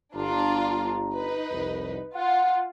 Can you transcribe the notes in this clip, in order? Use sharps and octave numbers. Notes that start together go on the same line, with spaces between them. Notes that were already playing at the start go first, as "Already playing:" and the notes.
G1 D4 F4 A#5
D#4 B4
C2 F2
F4 F#5